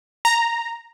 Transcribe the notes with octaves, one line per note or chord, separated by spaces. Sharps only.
A#5